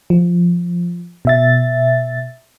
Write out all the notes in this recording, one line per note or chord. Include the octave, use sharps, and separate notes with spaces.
F3
B2 E5 A6